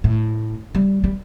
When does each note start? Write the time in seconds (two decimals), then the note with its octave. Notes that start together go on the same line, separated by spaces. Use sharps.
0.04 A2
0.75 G3
1.04 G3